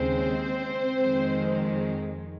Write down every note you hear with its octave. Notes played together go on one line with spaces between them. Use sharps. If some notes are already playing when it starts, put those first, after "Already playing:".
Already playing: D#2 C#3 G#3 C4 C5
F2 D#3 G#3